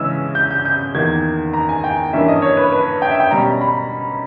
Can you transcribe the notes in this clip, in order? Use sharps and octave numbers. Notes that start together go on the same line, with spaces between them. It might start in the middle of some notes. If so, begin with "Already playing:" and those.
Already playing: C#3 E3 G#3 C#4 E6
G6
G6
G6
E2 D#3 A#3 G#6
A#5
G#5
G5
G2 E3 A#3 C#4 E5
D#5
C#5
B4
B4
G5
E5
G5
B2 G3 C#4 A#5
B5